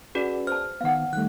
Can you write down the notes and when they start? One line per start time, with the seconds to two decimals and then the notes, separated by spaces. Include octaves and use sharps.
0.15 C#4 F#4 G#4 B4 D5
0.47 C5 A5 F6
0.81 D#3 B3 F5 F#5
1.13 D#3 G3 A3 F#6